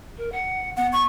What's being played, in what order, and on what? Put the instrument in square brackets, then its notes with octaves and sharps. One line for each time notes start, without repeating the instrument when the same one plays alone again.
[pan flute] A#4
F#5
[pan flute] B3 [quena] F#5
[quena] C#6